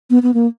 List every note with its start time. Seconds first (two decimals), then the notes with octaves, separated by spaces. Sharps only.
0.10 B3
0.23 B3
0.34 A#3